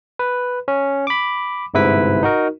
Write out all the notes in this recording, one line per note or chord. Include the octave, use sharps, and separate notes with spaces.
B4
C#4
B5 D6
G1 G#2 C3 E4 B4 B6
D#4 F#4 A#4